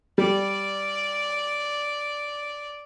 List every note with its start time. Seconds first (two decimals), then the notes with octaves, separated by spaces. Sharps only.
0.18 G3 D5